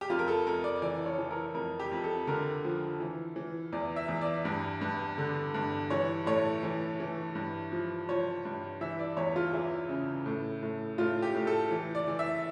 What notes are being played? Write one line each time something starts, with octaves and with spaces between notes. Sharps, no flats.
G4
F2 F4
A#4
A4
F2 A#4
D5
E3 D5
C#5
E3
A#4
F2 A#4
G4
F2
A4
D3 A#4
F3
E3
E3
E2 D5
E5
E2
D5
G2
G2
D3
G2
E3 C#5
A2 C#5
E3
E3
G2
F3
F3 C#5
G2
E3 E5
D5
E2 C#5
F4
E3 E4
C#3
A2
A2
A2 F4
G4
A2
A4
E3
D5
E3
E5